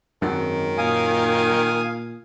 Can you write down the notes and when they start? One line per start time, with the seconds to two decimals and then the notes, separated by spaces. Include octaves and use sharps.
0.22 G#1 F#2 D#3
0.78 A#2 F5 G#5 D#6